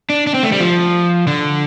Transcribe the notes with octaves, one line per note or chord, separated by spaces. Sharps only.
D4
D4
C4
A3
G3
F3
D3